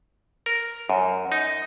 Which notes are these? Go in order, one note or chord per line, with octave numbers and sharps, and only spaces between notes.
A#4
F#2
D#4